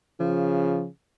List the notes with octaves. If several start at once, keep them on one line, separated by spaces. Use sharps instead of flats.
C#3 F3